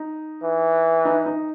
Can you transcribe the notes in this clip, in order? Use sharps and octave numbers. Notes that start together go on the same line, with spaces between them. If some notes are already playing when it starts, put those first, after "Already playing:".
Already playing: D#4
E3
D#4
D#4